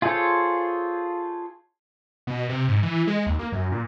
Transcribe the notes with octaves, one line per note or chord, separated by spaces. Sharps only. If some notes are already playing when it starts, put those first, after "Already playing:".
F4 G#4 A4 C5 C#5
B2
C3
G#2
E3
G#3
D#2
A#3
F#2
A#2